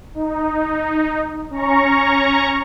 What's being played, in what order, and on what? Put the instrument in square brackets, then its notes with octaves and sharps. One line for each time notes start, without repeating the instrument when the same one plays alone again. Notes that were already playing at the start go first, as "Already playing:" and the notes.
[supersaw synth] D#4
C#4 A#5 C#6